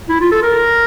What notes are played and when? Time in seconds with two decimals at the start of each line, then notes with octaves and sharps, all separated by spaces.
0.09 E4
0.21 F4
0.32 A4
0.43 A#4